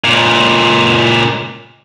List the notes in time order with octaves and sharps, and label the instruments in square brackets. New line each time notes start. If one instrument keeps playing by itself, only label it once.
[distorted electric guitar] C#2 A#2